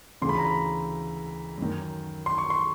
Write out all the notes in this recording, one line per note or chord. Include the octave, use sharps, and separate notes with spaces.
D2 C#3 E3 C6
B5
A#5
B5
F#2 D#3
C6
C#6
C6